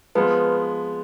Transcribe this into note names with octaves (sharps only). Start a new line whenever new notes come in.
F3 G#3 B3 B4